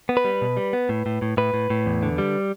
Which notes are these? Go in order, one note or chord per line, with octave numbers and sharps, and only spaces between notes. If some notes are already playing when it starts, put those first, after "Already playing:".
B3
B4
G3
B2
G3
B3
A2
A2
A2
A2 B4
A2
A2
E2
D3
G3